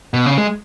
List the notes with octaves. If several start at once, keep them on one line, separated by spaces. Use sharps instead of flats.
B2
C#3
G#3